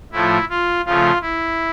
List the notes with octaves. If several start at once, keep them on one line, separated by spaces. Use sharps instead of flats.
A2 F3 A3 E4
F4
C#3 F3 A3 F4
E4